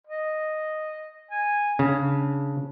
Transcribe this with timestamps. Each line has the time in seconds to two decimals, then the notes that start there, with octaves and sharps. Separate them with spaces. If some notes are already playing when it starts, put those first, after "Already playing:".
0.07 D#5
1.31 G#5
1.79 C#3 D4